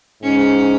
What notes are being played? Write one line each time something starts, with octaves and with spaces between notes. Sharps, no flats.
G#2 C#4